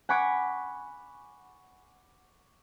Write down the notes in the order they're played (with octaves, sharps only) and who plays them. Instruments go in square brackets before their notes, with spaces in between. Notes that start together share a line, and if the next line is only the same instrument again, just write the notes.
[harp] F#5 G#5 B5 C#6 D6 G#6